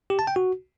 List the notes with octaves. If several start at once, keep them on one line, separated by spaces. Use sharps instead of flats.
G4
A5
G5
F#4